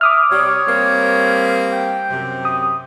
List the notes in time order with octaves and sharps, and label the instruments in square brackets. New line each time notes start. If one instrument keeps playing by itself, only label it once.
[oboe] E5 [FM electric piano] D6 D#6 F6
[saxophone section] C3 G3 [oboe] C#5
[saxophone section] G3 A#3 C4
[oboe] G5
[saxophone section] F#2 C3
[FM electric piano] D#6